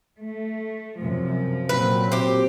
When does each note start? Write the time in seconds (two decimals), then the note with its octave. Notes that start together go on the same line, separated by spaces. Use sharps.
0.19 A3
1.00 F#2 C3 F3
1.69 A#2 F#3 C4 B4
2.12 G4 C5